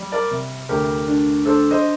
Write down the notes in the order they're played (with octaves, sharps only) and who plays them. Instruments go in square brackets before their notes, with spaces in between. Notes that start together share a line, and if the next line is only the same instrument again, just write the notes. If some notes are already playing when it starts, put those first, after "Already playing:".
Already playing: [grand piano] G3
A#4 D5
C3
D2 G4 A#4
D4
D4 A4 C5
C5 D#5